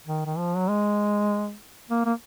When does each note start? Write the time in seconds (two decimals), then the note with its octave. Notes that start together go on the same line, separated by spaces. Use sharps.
0.07 D#3
0.26 D#3
0.38 F3
0.57 F#3
0.68 G#3
1.90 A#3
2.06 A#3